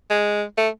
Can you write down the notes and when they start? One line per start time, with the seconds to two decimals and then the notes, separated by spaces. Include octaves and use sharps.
0.10 G#3
0.58 A3